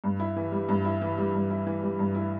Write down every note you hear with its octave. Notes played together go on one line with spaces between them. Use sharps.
G2
E4
E3
G3
G2
E4
E3
G3
G2
E4
E3
G3
G2
E4